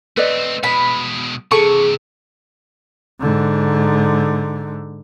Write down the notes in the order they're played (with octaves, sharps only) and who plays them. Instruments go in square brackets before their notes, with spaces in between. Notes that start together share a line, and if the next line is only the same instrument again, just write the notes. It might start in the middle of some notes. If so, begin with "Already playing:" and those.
[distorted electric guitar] A3 C4 [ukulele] B4 D5 D#5
[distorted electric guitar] B2 G#3 [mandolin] B5
[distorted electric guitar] C3 E3 [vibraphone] G#4 [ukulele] A4 [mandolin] C#6
[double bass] G#2 D3